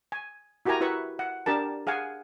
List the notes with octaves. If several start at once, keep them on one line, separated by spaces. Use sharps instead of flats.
G#5
E4 F#4 G4 A#4 G#5 A#5
E4 F#4 B4 E5 B5 C#6
F#5
D4 G4 A#4 A5
G#4 F5 F#5 G#5